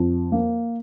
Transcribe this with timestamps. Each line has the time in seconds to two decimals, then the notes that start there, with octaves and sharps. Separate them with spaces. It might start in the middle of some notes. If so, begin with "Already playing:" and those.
Already playing: F2
0.32 A#3